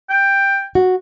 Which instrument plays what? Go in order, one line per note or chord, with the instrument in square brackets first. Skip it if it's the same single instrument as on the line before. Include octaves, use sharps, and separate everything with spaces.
[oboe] G5
[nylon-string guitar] F#4